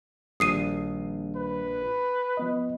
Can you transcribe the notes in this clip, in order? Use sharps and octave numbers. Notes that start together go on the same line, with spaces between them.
A#1 D#3 G3 D#6 C7 D#7
B4
F3 B3 D#5